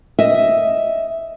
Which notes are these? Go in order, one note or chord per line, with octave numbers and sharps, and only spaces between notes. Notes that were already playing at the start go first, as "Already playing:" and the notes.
D#5 E5